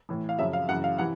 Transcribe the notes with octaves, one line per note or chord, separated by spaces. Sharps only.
A2 E3
F5
F#2 C#3 F3 E5
F5
F#2 C#3 E3 F#5
F5
C3 E3 F#5